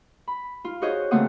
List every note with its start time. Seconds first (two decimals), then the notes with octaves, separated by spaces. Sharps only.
0.28 B5
0.65 F4
0.82 F#4 G#4 C5 C#5 D#5
1.11 C#3 A3 A#3 C4 F#5 D#6